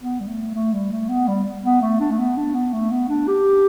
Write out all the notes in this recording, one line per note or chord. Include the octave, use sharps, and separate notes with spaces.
B3
G3
A3
A3
G3
A3
B3
G3
B3
A3
D4
A3
B3
D4
B3
A3
B3
D4
G4